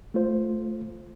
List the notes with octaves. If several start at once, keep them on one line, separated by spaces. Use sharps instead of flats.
A3 F4 C5